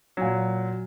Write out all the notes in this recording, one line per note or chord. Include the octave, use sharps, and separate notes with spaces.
A#2 F#3